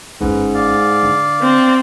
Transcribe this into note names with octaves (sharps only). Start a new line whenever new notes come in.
G1 G#2 C#4 B4
D5 F5
D3
C4